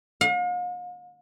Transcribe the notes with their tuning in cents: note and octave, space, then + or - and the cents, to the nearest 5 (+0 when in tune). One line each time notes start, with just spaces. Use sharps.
F5 +45